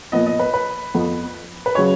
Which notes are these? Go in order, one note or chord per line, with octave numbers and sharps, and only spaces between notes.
A#2 F3 B3 D#5
D#5
B4
B4
F2 F3 B3
B4
C#3 F#3 C#5